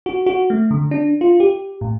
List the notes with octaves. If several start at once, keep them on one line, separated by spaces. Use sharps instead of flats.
F#4
F#4
A3
D3
D4
F4
G4
A2